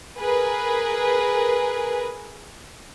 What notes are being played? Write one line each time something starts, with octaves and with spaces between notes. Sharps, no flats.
G#4 A#4 B4